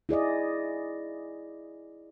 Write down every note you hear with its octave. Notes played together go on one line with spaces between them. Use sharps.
E4 G#4 D5 D#5